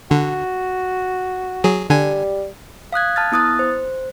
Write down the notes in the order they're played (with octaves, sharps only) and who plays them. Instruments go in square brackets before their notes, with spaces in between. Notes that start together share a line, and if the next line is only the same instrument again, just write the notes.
[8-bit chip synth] D3 [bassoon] F#4
[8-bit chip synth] F#3 G#4
[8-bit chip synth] D3 G#5 [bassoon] G3
[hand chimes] F5 D#6 F#6 G#6
A5 F6 A6
B3 E4 D#6 F#6 A6
C5